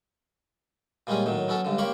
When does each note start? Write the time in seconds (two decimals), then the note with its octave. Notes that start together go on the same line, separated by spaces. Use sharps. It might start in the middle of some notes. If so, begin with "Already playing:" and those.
1.07 A#2 G3 G#3 C#4 G#4
1.26 A2 D#3 F#3
1.48 F#3 B3 C#4 A4
1.65 C#2 G2 D3
1.78 A#3 G4 C5 C#5 B5 D6